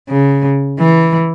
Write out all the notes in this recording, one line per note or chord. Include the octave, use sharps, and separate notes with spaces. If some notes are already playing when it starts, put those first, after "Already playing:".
C#3
E3